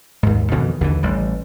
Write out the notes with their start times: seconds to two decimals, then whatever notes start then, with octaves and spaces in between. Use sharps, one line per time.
0.23 D#2 G#2
0.51 F2 B2 D#3 E3
0.81 D#2 D3 E3
1.03 A1 G3